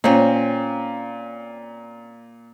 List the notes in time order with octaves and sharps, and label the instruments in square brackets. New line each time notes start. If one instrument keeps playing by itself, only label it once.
[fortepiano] A#2 [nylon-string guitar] C4 C#4